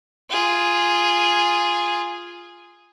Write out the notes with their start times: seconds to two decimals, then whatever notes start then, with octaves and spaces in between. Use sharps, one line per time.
0.30 F4 G#4